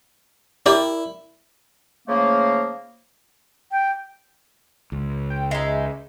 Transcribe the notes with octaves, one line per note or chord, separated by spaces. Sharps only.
E4 G4 A#4 D5
C#3 F3 A3 A#3
G5
C#2
G5
G#3 D#4 E5